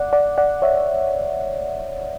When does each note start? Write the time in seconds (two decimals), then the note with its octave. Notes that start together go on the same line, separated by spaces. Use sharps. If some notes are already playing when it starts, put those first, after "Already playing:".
Already playing: D5 F#5
0.13 D5 F#5
0.38 D5 F#5
0.62 C#5 E5